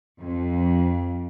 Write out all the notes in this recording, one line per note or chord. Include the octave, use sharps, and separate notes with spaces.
F2